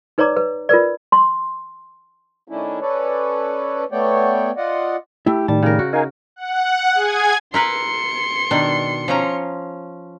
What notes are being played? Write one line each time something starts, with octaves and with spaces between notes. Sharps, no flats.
D#4 B4 C#5 D5 A#5 D6
B4
F4 A#4 B4 D5
C6
D#3 A3 C#4 D4 E4
C#4 A4 B4 C#5 D5
A3 B3 C#5 D5 G5
F4 D5 D#5 F#5
A3 E4 G4
A2 D#3 G3 A5
C#3 A#4
F#4
D#4 A#4 F5 G#5
F#5
G#4 G#5 G#6
E4 A#4 B4 C6 C#7
B2 D#3 D4
F3 C#4 A#5